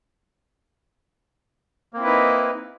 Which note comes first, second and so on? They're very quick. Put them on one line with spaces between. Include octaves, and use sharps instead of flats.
A#3 C4 E4 B4 D#4